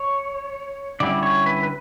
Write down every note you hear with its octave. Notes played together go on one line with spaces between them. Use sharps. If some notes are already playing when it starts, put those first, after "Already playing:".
Already playing: C#5
D3 G3 C#4 E4 D5
C#5
B4
B4